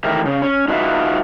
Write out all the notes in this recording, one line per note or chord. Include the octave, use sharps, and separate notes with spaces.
D#3 E3 A3 G4 A#4 E5
C#3
C#4
D#4 F4 F#4 B4 E5 F5